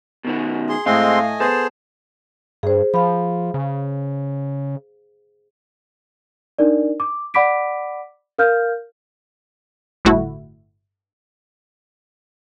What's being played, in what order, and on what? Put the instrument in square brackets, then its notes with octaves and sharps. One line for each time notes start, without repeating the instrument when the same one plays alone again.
[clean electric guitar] B2 D#3 F#4
[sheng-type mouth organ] G#4 C6
[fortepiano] A2 [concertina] G#3 C4 C6 [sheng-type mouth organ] A3 D#5 G#5 [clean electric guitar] F5
[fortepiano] B3 [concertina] G#4 C5 [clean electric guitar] A4
[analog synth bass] G2 [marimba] G#4 C5
[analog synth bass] F3 [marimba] F5 B5
[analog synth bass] C#3
[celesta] D4 D#4 A#4 D5
D6
D5 F#5 B5 D6 B6 D7
A#4 F5 F6 G6
[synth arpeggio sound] G1 A2 A3 E4 F#4